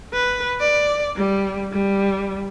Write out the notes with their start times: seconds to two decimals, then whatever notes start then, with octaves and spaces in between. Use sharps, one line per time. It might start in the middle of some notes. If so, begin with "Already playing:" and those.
0.13 B4
0.60 D5
1.16 G3
1.72 G3